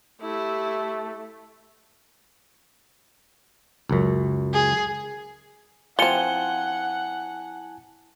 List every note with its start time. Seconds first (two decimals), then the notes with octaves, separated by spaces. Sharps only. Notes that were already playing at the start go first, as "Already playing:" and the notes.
0.21 A3 E4 G4
3.89 C#2 F#2
4.54 G#4
5.99 F3 C4 E4 F#5 G#5 A5 C#7 G7